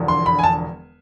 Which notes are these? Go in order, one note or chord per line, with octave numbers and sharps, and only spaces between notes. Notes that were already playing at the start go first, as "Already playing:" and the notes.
Already playing: E1 E2 D3 F3
C6
B5
G#5
A5